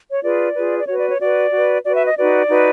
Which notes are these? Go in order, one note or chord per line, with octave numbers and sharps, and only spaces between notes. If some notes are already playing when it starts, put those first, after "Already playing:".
C#5
F4 G#4 B4 D5
F4 G#4 B4
D5
F#4 B4 C#5
D5
C#5
F#4 B4 D5
F#4 B4
F#4 B4 D5
E5
D#5
D#4 F#4 B4 D5
D#4 F#4 B4